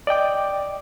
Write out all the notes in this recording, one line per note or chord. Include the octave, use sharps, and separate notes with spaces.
D5 D#5 G5 D6